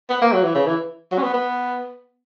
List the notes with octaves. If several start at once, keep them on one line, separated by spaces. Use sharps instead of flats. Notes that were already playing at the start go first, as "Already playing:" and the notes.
B3
A#3
F#3
E3
C#3
E3
F#3
C#4
B3
B3